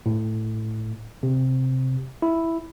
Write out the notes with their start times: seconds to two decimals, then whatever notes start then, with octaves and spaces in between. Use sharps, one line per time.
0.06 A2
1.23 C3
2.22 E4